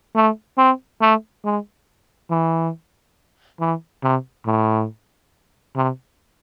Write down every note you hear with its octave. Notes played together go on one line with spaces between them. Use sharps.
A3
C4
A3
G#3
E3
E3
C3
A2
C3